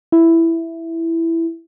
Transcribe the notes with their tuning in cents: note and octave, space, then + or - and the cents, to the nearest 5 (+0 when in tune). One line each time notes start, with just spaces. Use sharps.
E4 +5